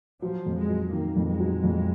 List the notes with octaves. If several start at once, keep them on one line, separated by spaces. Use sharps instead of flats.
F3 F#3
F2
G#3
F#3
D#3 A#3
F2
G#3
F#3
F2